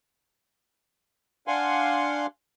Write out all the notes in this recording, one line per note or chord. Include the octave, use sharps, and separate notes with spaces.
D4 F5 F#5 G#5 C6